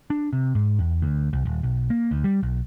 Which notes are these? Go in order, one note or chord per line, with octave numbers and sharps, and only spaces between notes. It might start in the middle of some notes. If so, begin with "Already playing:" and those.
D4
C3
G#2
E2
D2
C2
D#1
B1
A#3
D2
G3
B1